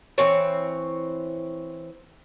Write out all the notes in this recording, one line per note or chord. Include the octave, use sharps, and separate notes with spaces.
E3 C4 C#5